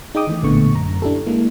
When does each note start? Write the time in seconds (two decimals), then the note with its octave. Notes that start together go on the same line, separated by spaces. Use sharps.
0.15 D#4 G#4 D#5 G5 D6 D#6
0.27 D#3 E3 A3
0.43 A1 A#2 D3 A3 B3 C#6
0.74 F#2 A#5
1.02 D4 E4 G4 A4
1.26 G#3 A#3 E4